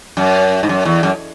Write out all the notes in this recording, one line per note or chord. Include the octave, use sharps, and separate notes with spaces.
F#2
G#2
F#2
E2
F#2